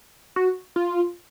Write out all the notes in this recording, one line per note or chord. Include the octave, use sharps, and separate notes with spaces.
F#4
F4